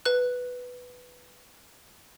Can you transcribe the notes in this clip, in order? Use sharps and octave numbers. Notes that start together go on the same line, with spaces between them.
B4 F#6